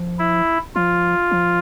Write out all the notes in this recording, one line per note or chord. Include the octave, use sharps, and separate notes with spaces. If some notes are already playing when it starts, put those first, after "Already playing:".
Already playing: F3
E4
F3 F4
F3